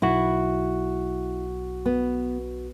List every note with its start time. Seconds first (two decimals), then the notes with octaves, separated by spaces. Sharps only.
0.02 B1 E4 F#4
1.86 B3